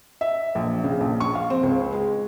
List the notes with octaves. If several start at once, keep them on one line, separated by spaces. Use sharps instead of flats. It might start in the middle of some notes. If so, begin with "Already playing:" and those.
E5
A#1
C#3
A#1
C#6
F5
C4
C#2
G#3